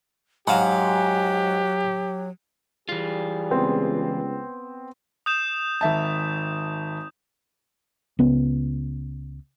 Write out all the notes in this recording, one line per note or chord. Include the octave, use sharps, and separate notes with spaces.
G#2 F#3 G4 F5 F#5
E3 G3 F4 G#4
C#2 B3 C4
D#6 G6 E7
G#1 E5 A5
C#2 B3